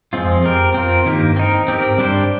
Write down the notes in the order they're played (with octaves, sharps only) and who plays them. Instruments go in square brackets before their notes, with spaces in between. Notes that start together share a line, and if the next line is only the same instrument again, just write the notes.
[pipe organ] F2 [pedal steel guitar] F3 G#3 C4 F4
[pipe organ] F2 [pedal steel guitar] C4 G4 A#4
[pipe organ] F2 [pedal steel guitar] C4 F4 A#4
[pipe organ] G2 [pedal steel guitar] D#3 A#3 D#4 G4
[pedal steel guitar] C4 D#4 A#4
[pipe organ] G#2 [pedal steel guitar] C4 G4 A#4
[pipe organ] G2 [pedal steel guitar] G3 D4 G4 C5